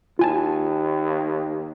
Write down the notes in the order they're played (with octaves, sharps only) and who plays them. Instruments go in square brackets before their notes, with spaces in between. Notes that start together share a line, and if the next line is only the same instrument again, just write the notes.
[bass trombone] D#2 [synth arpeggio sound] F4 G#5 A5